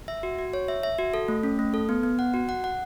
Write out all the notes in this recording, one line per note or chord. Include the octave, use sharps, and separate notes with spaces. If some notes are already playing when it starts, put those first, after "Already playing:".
E5
F#4
F#4
C#5
E5
E5
F#4
A4
A3
C#4
A3
A4
B3
B3
F#5
F#4
F#5
F#5